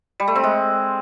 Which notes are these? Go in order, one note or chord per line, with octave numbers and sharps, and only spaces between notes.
G3
A3
C4
G#3